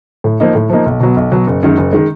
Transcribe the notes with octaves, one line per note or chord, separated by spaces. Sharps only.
A2
F3 A#3 D#4
A2
F3 A#3 D#4
B1
B2 F#3 B3
B1
B2 F#3 B3
F#1
F#2 D#3 G#3
F#1
D#3 G#3